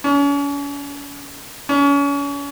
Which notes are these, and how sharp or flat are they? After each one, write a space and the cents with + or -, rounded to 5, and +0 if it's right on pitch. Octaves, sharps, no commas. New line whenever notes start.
C#4 +40
C#4 +35